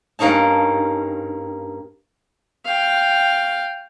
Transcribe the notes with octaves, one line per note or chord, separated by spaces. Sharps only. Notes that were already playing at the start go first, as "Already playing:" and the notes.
G2 A#3 C#4 D#4 A5
F5 G5